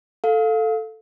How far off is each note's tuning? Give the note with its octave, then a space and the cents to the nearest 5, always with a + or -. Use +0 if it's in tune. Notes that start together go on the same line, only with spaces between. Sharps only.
A4 +0 F5 +10